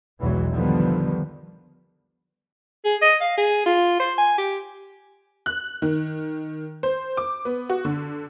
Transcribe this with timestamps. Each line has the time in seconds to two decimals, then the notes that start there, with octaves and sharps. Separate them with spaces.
0.19 B1 E2 E3 F#3 G#3
0.51 D3 D#3 F3 G3 B3
2.85 G#4
3.01 D#5
3.21 F5
3.37 G#4
3.66 F4
4.00 C5
4.18 G#5
4.38 G4
5.46 F#6
5.82 D#3
6.83 C5
7.17 D6
7.45 B3
7.69 F#4
7.85 D3